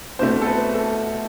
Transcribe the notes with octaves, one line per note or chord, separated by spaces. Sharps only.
C2 B2 A3 C5
A4
B4
A4